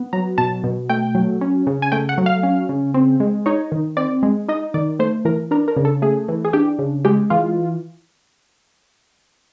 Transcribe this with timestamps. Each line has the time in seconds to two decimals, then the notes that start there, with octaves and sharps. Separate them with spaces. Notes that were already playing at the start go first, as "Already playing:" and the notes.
Already playing: B3
0.13 F#3 A#5
0.38 B2 A5
0.64 B2
0.89 A3 G5
1.15 F#3
1.41 C#4
1.67 C#3
1.82 G#5
1.92 A3 G5
2.09 F#5
2.18 F#3
2.26 F5
2.43 C#4
2.69 C#3
2.94 C4
3.20 G#3
3.46 D#4 C#5
3.72 D#3
3.97 C4 D5
4.23 G#3
4.48 D#4 D#5
4.74 D#3 D5
4.99 A3 C5
5.25 E3 A#4
5.51 D4 A#4
5.68 A#4
5.77 C#3
5.85 A4
6.02 A3 G#4
6.28 E3
6.45 G#4
6.53 D4 G4
6.79 C#3
7.05 G#3 G4
7.30 E3 F4